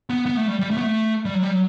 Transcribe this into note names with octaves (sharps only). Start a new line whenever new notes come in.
B3
B3
A3
G3
G3
A3
B3
A3
G3
F#3
G3
F#3